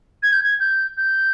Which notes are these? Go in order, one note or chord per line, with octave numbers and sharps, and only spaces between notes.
G#6
G6
G#6
G6
G6